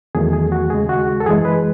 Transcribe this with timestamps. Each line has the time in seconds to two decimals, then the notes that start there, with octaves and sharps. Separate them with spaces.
0.15 E2 D#3 F#3 A3 G#4
0.33 G#4
0.52 F#4
0.70 D#2 C#3 G#3 G#4
0.89 F#4
1.08 F#4
1.20 A4
1.26 F#2 E3 G#3 G#4
1.45 B4